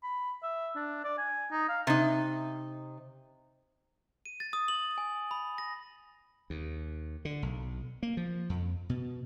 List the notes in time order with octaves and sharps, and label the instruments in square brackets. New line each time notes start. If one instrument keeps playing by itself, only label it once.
[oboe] B5
E5
D4
D5
G#5
D#4
F5
[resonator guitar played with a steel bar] C3 D#4
[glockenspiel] D#7
A6
D#6
F#7
G#5
B5
A#6
[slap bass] D#2
D3
B1
A#3
F3
F2
B2